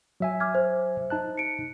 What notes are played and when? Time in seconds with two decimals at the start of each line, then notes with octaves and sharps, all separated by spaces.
0.20 F#3 E5 G#5
0.40 D6 F6 G#6
0.55 C5
1.10 D#4 A5 F#6
1.37 C#7 D7